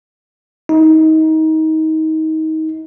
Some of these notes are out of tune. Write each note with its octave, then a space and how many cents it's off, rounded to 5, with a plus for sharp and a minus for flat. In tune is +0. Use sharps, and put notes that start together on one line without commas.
D#4 +25